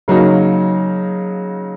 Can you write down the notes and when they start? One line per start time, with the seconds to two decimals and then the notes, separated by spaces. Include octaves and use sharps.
0.08 C#3 F#3 A#3 D#4